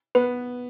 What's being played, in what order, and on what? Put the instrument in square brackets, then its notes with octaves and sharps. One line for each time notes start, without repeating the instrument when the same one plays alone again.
[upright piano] B3 [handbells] B4